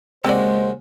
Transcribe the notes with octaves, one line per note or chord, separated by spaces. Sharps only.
D#2 C#3 G#3 C4 F#4 C5 D5